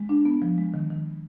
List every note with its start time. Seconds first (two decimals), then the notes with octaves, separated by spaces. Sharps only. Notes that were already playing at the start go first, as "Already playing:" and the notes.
Already playing: G#3
0.09 D4
0.25 B3
0.42 F3
0.58 G#3
0.74 D#3
0.91 D#3